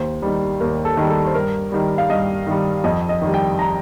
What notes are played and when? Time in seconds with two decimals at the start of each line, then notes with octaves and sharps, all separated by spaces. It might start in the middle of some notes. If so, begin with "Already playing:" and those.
Already playing: D#2 C5
0.22 D#3 G3
0.60 D#2 A#4
0.85 A4
0.97 D#3 G3
1.10 A4
1.27 C5
1.34 G2 A#4
1.72 D#3 G3
1.98 F5
2.10 G2 D#5
2.47 D#3 G3
2.84 F2 D#5
3.09 D#5
3.22 D#3 G3
3.34 G5
3.59 A#5